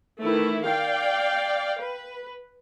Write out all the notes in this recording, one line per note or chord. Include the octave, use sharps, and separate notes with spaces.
D#3 E3 A3 E4
D5 F5 G5
B4